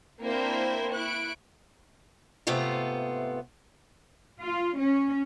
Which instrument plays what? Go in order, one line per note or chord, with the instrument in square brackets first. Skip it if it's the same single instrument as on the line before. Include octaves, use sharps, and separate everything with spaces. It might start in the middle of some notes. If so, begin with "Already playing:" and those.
[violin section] A#3 C4 D4 E4 A#4 C5
E4 C#6 F#6 D7
[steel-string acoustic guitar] G#2 C3 A3 B3 F4
[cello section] F4
C#4